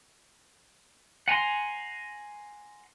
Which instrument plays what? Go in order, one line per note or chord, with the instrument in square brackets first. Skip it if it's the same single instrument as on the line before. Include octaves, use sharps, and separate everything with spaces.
[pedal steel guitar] F#5 G#5 A#5 C6